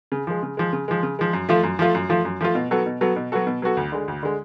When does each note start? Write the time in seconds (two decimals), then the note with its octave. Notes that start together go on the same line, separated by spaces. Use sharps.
0.12 C#3
0.27 F3 G#3
0.43 C#3
0.57 F3 G#3
0.73 C#3
0.88 F3 G#3
1.03 C#3
1.19 F3 G#3
1.33 F#2
1.49 F3 A3 F4
1.63 F#2
1.79 F3 A3 F4
1.95 F#2
2.09 F3 A3 F4
2.25 F#2
2.41 F3 A3 F4
2.55 B2
2.71 F#3 B3 F#4 A4
2.86 B2
3.01 F#3 B3 F#4 A4
3.16 B2
3.32 F#3 B3 F#4 A4
3.47 B2
3.62 F#3 B3 F#4 A4
3.77 D2
3.92 D3 G#3
4.08 D2
4.23 D3 G#3